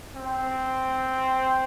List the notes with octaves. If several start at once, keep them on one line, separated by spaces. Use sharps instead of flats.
C4